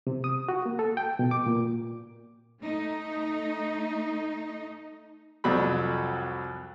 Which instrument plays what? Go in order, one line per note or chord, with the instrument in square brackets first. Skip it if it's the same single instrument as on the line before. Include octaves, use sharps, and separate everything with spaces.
[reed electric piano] C3
D#6
F#4
A#3
A4
G5
B2
D6
A#2
[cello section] A3 D#4
[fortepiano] C2 F2 F#3 G3 B5